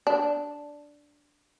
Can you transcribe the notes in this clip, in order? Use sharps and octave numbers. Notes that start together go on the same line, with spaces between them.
D4